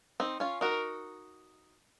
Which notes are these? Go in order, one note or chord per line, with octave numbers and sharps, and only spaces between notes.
C4 D#4
C#4 F4
D#4 F#4 A#4